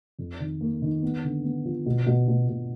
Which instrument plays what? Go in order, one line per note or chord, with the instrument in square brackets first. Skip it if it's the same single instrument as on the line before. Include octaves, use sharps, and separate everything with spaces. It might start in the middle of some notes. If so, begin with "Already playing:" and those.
[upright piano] F2
D#3
A#3
D#3
B3
D3
B3
F3
B2
B2
B2
B2